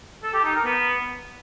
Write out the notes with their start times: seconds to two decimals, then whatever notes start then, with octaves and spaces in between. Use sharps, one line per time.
0.23 A4
0.34 G4
0.44 D#4
0.54 A#4
0.65 B3